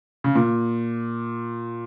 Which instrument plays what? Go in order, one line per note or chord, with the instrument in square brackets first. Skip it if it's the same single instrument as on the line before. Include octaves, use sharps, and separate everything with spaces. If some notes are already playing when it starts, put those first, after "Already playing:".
[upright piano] C#3
A#2